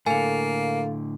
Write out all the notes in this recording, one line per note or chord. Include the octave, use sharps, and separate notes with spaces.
A2 D3 A#3 A4 F5 G#5